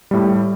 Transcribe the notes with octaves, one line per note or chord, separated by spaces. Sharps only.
A2 G3